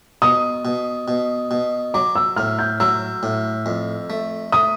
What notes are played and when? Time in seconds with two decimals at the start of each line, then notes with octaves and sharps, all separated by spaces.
0.22 B2 D#6
0.65 B2
1.08 B2
1.51 B2
1.94 F#3 D6
2.16 E6
2.36 A2 F6
2.59 G6
2.80 F#3 E6
3.23 A2
3.66 F2
4.10 A3
4.52 A3 D#6